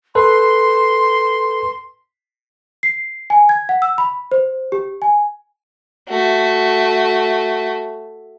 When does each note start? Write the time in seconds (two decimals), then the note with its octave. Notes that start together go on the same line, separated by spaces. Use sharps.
0.15 A4 B4 C6
2.83 C7
3.30 G#5
3.49 G#6
3.69 F#5
3.82 E6
3.98 B5
4.32 C5
4.72 G4
5.02 G#5
6.09 A3 F#4